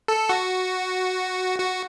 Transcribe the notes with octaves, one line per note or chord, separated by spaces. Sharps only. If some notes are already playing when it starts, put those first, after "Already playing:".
A4
F#4
F#4